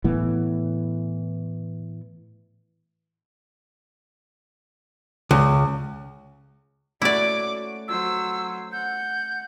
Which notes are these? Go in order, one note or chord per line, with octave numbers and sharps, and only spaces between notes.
A2 E3 B3
C#2
A3 C#4 E4 F#4 D5 F#5 D6
F#3 C5 E6
F#5 G6